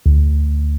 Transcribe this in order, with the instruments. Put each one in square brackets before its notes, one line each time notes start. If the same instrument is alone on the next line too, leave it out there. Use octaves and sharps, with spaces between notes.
[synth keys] D2